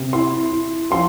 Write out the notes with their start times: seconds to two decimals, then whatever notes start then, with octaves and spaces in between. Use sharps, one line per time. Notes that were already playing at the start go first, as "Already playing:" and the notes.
Already playing: C3
0.13 E4 C6
0.52 E4
0.90 F3 C6